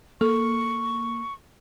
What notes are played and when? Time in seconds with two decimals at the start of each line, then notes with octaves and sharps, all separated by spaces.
0.21 A#3 A4 C#6